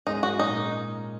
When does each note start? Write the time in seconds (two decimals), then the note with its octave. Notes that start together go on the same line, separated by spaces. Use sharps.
0.07 G#2 G#3 C#4 D#4 G#4 D#5
0.23 F#4
0.39 A#2 G#3 C#4 D#4 A#4